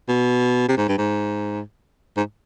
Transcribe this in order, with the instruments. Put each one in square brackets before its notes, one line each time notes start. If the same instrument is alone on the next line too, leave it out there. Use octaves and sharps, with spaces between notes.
[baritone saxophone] B2
C3
G#2
G2
G#2
G#2